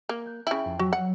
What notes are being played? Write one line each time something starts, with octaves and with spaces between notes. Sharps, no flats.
A#3
F#6 G6
C#3 E4 G5 A6
F2
F#3 F#4 E6 B6
F#5